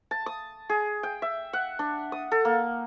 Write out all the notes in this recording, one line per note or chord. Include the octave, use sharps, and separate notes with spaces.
A5
D#6
G#4
G5
E5
F#5
D4
D#6
A4
A#3